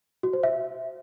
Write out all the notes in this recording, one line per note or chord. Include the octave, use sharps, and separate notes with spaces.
F#4
C5
E5